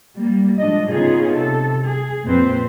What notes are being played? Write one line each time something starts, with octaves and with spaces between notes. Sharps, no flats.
G3 A#3
G#2 F3 D4 D#5
C#3 B3 C#4 D#4 F4 G#4
C3 A4
G#4
F2 A#2 C4 B4 C5